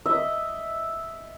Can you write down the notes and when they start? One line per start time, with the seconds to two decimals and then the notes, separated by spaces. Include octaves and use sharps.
0.06 D#5 E5